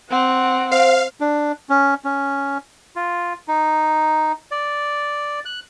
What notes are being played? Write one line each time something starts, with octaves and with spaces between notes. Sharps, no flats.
C4 F#5
C5 F5
D4
C#4
C#4
F4
D#4
D5
F#6